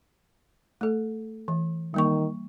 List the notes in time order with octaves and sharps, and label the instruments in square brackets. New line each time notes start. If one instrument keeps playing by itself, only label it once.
[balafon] A3 A4
E3
[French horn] D#3 [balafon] G3 A#3 C#6